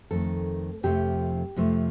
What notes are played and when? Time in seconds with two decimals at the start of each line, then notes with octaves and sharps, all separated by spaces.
0.11 F2 D#3 A3 A4
0.83 F2 C3 F3 A3 G4
1.56 F2 C3 F3 A3